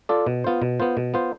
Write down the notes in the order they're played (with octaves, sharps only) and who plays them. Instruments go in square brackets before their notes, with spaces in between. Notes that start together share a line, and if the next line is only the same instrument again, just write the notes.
[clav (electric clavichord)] F4 A4 D5
B2
B3 F4 C5
B2
B3 F4 C5
B2
B3 F4 C5